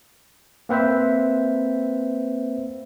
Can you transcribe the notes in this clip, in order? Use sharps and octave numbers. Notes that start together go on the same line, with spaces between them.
A#3 C4 B4 C5 E5